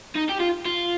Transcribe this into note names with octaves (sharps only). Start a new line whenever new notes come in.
D#4
G4
F4
F4